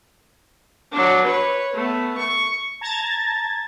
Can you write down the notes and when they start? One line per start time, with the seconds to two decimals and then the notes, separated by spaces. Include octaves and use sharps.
0.92 F#3 D4
1.25 B4 C#5
1.74 A3 B3
2.18 C#6
2.81 A5 A#5 G#6 A6